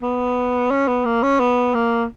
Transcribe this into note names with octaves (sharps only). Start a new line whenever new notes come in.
B3
C#4
B3
A#3
C#4
B3
A#3